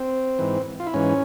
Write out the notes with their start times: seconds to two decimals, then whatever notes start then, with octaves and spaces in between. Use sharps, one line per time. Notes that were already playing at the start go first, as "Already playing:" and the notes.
Already playing: C4
0.39 G#2 E3
0.80 F4
0.87 E4
0.94 G#2 E3 C#4